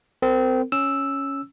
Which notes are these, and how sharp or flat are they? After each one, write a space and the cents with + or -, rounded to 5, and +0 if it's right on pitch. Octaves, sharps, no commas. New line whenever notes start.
C4 -25 A#4 -40
C#4 +0 E6 +0